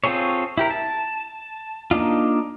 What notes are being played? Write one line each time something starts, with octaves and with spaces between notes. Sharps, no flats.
C4 F4 G#4 A4 C#5
E4 G4 A#4
A5
A#3 D4 D#4 F4